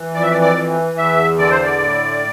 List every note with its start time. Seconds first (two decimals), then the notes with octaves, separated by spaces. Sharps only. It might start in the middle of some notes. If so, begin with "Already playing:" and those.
Already playing: E3
0.14 F2 D5
0.22 E5
0.31 D5
0.41 D5
0.55 E3
0.97 E2 E5
1.38 D3 D5
1.51 C5
1.63 D5
1.80 A2